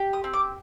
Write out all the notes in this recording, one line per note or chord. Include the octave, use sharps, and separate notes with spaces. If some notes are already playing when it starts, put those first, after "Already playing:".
Already playing: G4
D#6
C4
D6